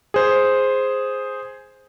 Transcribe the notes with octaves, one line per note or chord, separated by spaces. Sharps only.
G#4 C5